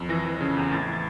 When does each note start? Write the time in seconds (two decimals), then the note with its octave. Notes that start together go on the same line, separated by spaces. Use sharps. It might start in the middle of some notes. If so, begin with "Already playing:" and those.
Already playing: F2
0.09 E3 A#6
0.26 E3
0.41 C#3
0.57 E2
0.71 A2 A6
0.83 E3 G#6
0.93 A6